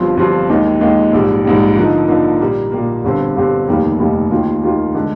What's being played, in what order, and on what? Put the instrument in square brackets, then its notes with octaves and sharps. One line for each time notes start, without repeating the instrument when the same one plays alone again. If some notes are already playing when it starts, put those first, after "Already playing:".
Already playing: [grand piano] G1 G2 F3 C4 F4
G1 G2 F3 C4 F4
D#2 D#3 G#3
D#2 D#3 G#3
A#1 G#2 G3
A#1 G#2 G3
D3 F3 A#3 D#4
D3 F3 A#3 D#4
A#2 G3 A#3
A#2 G3 A#3
G1 G2 D3 G3 C4
G1 G2 D3 G3 C4
F1 D#2 D#3 G3 A#3
F1 D#2 D#3 G3 A#3
D#2 D#3 A#3 F4
D#2 D#3 A#3 F4
D3 G#3